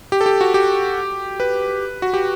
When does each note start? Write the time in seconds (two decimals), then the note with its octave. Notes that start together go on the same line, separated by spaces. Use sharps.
0.12 G4
0.21 A4
0.26 G4
0.41 F#4
0.54 G4
1.40 B4
2.02 F#4
2.14 G4